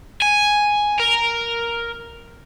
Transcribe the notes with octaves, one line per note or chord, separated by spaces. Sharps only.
G#5
A#4